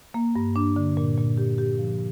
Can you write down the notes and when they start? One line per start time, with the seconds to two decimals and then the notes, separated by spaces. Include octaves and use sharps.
0.14 A#3
0.36 G2
0.56 D4
0.76 D3
0.97 A#2
1.17 A#2
1.38 G4
1.58 G4
1.79 F3